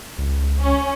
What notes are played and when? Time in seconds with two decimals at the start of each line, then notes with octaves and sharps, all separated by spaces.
0.18 C#2
0.58 C#4